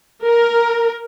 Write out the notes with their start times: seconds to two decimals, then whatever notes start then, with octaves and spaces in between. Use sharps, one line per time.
0.24 A#4